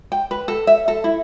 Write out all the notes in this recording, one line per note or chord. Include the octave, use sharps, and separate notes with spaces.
G5
B4
A4
E5
A4
E4